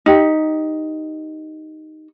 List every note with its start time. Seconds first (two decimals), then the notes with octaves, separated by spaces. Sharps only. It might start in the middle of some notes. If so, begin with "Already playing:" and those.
0.06 D#4 G4